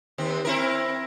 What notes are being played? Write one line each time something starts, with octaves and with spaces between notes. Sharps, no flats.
D#2 C4
C4 E4 A#4